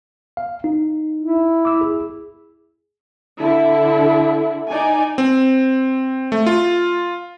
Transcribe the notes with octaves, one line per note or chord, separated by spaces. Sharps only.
F5
D#4
E4
D6 E6
G#4
D3 E4
D#4 D5 G#5
C4
A3
F4